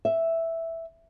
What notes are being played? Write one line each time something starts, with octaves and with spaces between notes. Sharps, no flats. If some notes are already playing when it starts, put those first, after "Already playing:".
E5